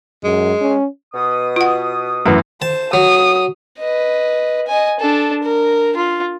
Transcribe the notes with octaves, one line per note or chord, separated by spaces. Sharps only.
F#2 G#3
C#4
B2 D#6
F4 F#5
F#2 E3 A3 F#5
C5 A5
F#3 D#6
B4 D#5
D#5 G#5
D4 A4
A#4
F4